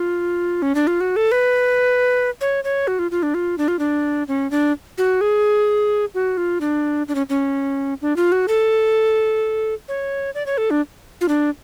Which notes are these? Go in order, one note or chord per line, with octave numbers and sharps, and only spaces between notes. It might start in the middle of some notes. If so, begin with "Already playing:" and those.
Already playing: F4
C#4
D4
F4
F#4
A4
B4
C#5
C#5
F#4
F4
F4
D4
F4
D4
F4
D4
C#4
D4
F#4
G#4
F#4
F4
D4
D4
C#4
C#4
D4
F4
F#4
A4
C#5
D5
C#5
A4
D4
F4
D4